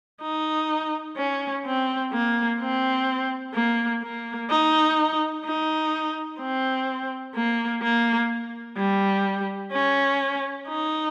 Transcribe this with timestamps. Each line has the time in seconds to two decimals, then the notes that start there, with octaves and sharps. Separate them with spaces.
0.22 D#4
1.17 C#4
1.66 C4
2.12 A#3
2.60 C4
3.54 A#3
4.03 A#3
4.50 D#4
5.45 D#4
6.40 C4
7.35 A#3
7.83 A#3
8.77 G3
9.72 C#4
10.68 D#4